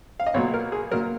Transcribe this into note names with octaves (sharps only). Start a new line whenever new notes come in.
F5
D#5
B1 A#2 F#3 C#5
A#4
G#4
A#2 F#3 A#4